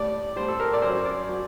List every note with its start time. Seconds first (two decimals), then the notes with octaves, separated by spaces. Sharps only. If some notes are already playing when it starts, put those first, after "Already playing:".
Already playing: A2 G3 D5
0.36 A2 G3 C5
0.48 A4
0.60 A#4
0.73 D5
0.82 F#2 F#3 C5
1.05 D5
1.29 F#3